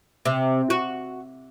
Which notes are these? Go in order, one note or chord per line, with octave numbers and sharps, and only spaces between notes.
C3
F#4